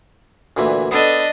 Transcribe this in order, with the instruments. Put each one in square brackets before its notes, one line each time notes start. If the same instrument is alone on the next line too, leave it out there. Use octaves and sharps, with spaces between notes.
[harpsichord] D2 A#2 E3
[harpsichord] B3 A4 [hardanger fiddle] D4 D#5